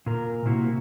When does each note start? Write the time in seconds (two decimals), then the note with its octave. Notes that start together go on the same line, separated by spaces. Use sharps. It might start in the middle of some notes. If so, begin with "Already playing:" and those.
0.06 A#2 A#4
0.45 C3 A#3 E4 F#4